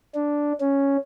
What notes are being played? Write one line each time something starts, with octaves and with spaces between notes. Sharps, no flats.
D4
C#4